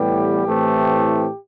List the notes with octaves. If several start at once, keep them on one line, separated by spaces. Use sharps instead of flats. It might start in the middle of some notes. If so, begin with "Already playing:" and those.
Already playing: A2 E3 G3 B3 G4
A2 E3 A3 C4